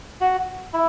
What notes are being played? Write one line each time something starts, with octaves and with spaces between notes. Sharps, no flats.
F#4
E4